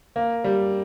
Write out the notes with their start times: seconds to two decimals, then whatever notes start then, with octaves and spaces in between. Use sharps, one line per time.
0.16 A#3
0.44 G3